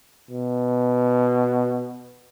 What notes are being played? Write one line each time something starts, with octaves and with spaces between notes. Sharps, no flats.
B2